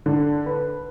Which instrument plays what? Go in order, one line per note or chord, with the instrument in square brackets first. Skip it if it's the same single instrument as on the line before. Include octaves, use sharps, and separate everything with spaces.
[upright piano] D3
B4